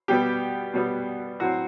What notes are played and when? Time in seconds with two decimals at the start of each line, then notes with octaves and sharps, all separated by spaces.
0.08 B2 G3 B3 G4
0.74 B2 G3 B3
1.40 A2 F#3 C4 F#4